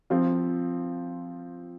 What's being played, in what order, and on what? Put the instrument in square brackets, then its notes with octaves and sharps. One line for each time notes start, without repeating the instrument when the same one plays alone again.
[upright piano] F3 C4 F4